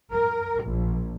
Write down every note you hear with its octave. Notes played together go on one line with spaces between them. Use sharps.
A#4
A#1